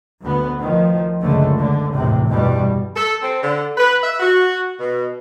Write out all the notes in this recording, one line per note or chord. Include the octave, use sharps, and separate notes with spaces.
D2 B3
D#3 F3
C#2 F#2 D3 A3
D3
G#1 E2 A2 C3
E2 G2 B2 G3
A4
C4
D3
B4
E5
F#4
B2